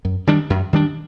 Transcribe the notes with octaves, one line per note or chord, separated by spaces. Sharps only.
F#2
D#3 G3 D4
F#2
D#3 G3 D4